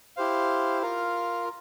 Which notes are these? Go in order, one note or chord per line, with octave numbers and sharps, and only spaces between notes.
E4 G4 C5 F5
F4 A#4 F5